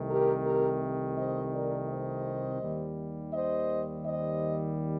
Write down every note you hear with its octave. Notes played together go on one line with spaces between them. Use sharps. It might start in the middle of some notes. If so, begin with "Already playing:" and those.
Already playing: C2 C3 D#3 A3
G4 A#4
G4 A#4
C5 D#5
A#4 D5
C5 D#5
D#2 D#3 G3
C5 D#5
C5 D#5